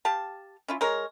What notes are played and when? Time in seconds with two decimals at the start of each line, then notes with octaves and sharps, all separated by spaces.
0.05 G4 F5 A5
0.68 C#4 E4 F4
0.81 G#3 A#4 C#5